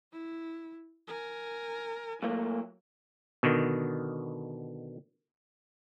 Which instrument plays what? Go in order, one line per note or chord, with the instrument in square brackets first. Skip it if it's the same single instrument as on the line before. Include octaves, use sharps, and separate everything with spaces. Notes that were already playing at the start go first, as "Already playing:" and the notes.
[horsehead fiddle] E4
A#4 G#5
[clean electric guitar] A#2 A3 A#3 [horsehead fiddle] F#3
[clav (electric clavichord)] B2 D3 D#3